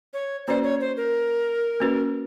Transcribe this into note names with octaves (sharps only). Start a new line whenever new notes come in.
C#5
A#3 C#4 F#4 B4 C5 D5
C#5
C5
A#4
A#3 C#4 F#4 B4